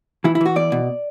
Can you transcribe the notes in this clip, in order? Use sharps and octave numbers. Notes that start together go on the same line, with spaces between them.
E3 E4
E4
E3 F#4
E2 D5
B2